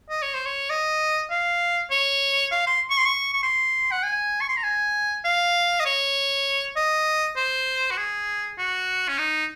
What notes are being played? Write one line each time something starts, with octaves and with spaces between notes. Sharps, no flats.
D#5
C#5
C5
C#5
D#5
F5
C#5
F5
C6
C#6
C6
C#6
C#6
C6
F#5
G#5
C#6
C6
A#5
G#5
F5
D#5
C#5
D#5
C5
F#4
G#4
F#4
C#4
D#4